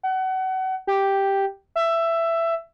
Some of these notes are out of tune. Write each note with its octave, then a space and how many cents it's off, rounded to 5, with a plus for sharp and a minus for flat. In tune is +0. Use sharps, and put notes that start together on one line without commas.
F#5 +30
G4 +0
E5 +15